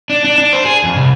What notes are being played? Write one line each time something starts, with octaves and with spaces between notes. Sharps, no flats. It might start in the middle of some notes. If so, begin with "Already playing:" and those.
D4
D4
D4
C5
G#4
F2
C2